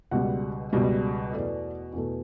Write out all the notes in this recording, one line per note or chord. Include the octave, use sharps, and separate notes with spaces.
C#2 B2 G3 F#5
C#2 B2 G3
E2 B2 A3 D5
E2 B2 A3